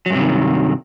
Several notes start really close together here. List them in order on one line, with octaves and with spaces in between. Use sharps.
F#3 G2 C3 D#3